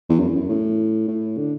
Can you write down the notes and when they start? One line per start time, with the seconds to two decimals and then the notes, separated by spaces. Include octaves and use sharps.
0.10 E2
0.19 F#2
0.29 E2
0.35 F#2
0.49 A2
1.08 A2
1.38 D3